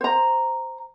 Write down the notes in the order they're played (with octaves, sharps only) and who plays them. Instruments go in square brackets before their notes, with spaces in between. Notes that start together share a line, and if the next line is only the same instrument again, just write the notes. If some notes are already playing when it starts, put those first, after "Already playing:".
[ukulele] C5 A#5